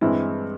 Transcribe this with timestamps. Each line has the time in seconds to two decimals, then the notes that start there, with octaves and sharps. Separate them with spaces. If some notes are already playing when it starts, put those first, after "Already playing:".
0.01 G2 E3 G#3 C4 E4